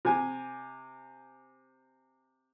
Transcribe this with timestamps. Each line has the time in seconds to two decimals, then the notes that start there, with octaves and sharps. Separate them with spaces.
0.05 C3 G#5